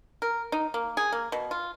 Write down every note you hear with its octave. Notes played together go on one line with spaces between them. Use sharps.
A#4
D#4
A#3
G#4
A#3
B2
F4